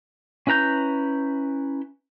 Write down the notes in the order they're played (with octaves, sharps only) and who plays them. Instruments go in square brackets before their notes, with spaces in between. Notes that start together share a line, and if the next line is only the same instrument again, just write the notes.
[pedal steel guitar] C#4 E4 B4 A#5 G6